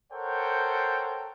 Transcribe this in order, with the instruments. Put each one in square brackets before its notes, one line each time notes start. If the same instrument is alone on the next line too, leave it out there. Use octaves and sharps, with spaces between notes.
[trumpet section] A4 A#4 C5 C#5 F#5 G5